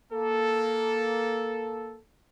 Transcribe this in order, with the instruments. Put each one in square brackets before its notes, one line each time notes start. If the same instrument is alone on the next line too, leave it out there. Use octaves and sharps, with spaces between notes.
[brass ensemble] A#3 A4